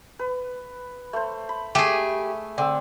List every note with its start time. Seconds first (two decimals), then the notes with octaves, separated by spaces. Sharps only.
0.19 B4
1.13 A3 C5
1.49 B5
1.75 A3 G4 G#4 G5 G#5
2.58 D3 C4 E6